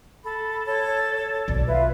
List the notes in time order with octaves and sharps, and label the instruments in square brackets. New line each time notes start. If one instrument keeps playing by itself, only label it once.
[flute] A4 [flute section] B5
[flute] A4 [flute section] C#5
[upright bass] B1 [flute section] D5
[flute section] F4 B4 E5